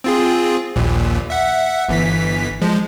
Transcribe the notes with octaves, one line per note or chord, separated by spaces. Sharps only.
C4 F4 G#4
A#1 D#2 A#2
E5 F#5
G1 E3 B6
F3 G#3